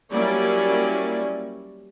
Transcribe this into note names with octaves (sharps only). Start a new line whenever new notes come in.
F#3 G3 A#3 C#4 E4 D5